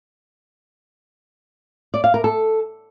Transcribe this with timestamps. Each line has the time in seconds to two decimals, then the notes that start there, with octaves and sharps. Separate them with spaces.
1.94 D5
2.04 F5
2.14 A#4
2.24 A4